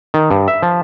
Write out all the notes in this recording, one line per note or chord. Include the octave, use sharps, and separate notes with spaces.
D#3
G2
E5
F3